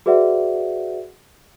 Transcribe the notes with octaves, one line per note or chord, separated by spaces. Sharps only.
F#4 G#4 B4 D5 E5 F#5